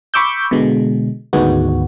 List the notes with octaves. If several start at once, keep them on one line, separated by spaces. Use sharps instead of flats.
B5 C#6 D6 E6 G6
B2 D3 G#3
D2 G#2 D#3 G#3 B3 F#4